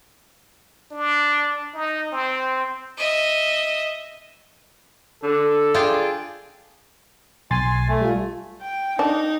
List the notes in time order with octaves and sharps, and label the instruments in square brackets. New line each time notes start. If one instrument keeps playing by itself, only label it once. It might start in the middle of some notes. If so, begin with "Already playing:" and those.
[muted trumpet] D4
D#4
C4
[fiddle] D#5 E5
[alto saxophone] D3 [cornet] A4
[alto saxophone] D4 [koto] F4 G#4 G5
[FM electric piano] B1 C6 A6 [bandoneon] G#5
[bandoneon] A3
[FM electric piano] G3 F4
[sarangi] G5
[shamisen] D4 [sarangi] D#4